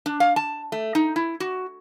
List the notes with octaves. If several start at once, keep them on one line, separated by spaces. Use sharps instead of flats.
D4
F5
A5
A3
D#4
E4
F#4